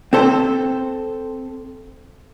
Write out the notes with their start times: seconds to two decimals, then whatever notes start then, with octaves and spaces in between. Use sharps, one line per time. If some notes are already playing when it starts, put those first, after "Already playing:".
0.13 C4 A4 C5